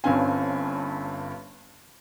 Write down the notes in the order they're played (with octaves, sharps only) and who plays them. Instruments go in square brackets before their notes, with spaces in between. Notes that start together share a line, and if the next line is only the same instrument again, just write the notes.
[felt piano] G1 G2 C4 C#4 F5 G#5